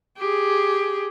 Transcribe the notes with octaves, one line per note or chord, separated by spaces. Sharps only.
G4 G#4